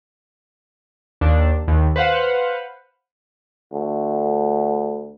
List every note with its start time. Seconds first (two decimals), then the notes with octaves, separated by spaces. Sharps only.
1.21 D#2 D4
1.68 D#2
1.96 B4 C5 F5 F#5
3.73 D2